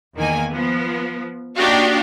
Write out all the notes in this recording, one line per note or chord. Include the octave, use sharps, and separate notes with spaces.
E2 D#3 A#3 G#5
F3 B3
A#3 D4 D#4 F#4 G4 F5